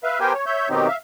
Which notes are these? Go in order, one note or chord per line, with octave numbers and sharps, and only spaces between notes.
B4 E5 F5
B3 G4 A#4 C5 G5 G#5
C#5
C#5 E5 G6
B2 D#3 F#3 C4 D#4 G4
E5 F5